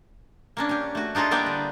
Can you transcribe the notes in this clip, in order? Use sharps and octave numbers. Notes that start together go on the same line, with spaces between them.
A#3 C#4 D4
C#4 G4
A3 F#4
D4 D#4 F4 G#4 A4
G3 A#3 B3 E4 D5 G5
D3